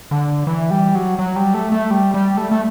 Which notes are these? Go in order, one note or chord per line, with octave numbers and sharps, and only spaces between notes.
D3
E3
G3
F#3
F#3
G3
A3
A3
G3
G3
A3
A3